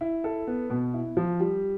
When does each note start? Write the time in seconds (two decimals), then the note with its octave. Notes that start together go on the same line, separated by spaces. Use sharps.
0.01 E4
0.24 A4
0.47 B3
0.70 B2
0.94 E4
1.17 F3
1.40 G3